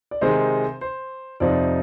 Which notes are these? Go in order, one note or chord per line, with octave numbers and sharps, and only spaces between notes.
D5
C3 D#3 G#3 C4 D#4 C5
C5
F2 C3 F3 C4 D#4 D5